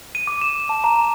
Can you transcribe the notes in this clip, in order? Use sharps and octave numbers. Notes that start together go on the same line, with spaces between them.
D#7
D6
E7
A5
A#5